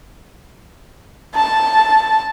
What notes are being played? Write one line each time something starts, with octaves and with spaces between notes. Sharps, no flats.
A5